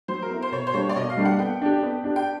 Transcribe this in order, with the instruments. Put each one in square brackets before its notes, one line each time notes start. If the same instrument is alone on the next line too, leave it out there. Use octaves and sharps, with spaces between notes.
[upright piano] F#3 [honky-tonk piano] C5
[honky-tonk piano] A#4
[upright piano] B3 E4
[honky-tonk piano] C5
[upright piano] B2 [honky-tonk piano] C#5
[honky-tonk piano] C5
[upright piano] G3 A#3 D4 G4 [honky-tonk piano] C#5
[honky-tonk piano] D5
[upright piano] B2 [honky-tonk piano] D#5
[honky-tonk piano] F5
[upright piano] G3 A#3 D4 G4
[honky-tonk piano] F#5
[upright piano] B3 [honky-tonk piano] G5
[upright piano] D4 G4
B3
D4 G4
[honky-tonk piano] G5